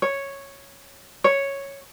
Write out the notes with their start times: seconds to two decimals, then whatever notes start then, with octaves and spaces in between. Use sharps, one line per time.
0.02 C#5
1.24 C#5